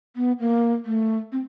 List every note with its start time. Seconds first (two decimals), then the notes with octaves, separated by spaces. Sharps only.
0.16 B3
0.40 A#3
0.86 A3
1.32 C4